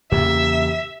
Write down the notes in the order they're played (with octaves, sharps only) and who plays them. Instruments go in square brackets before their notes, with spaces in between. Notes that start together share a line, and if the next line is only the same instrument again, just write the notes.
[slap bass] E2 C#3 A#3 [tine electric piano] G4 [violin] E5